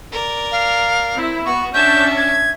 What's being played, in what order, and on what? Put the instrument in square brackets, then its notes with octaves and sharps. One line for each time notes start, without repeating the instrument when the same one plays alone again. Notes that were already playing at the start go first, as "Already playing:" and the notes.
[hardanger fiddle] A#4 D5
[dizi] F5
[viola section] C4 E4
[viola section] B3 [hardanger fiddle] F#4 [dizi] C#6
[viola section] C#4 D4 A5 [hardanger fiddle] E5 [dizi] G6
[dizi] G#6